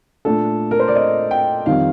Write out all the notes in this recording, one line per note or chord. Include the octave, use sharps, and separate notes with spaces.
A#2 A3 D4 A4
A#4
C5
D5
D#5
G5
F2 D#3 G3 C4 F5